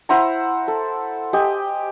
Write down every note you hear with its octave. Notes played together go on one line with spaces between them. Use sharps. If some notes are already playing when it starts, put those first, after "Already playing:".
E4 C5 F#5 A#5
A4
G4 D#5 G#5